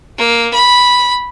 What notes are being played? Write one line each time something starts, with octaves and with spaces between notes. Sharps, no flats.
A#3
B5